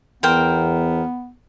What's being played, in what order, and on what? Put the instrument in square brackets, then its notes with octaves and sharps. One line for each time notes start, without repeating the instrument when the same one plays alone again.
[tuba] E2 [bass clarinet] B3 [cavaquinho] A#4 C5 G5